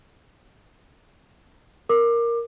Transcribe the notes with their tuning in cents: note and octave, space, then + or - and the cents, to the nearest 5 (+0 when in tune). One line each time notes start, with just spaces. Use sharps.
A#4 +0 D6 +20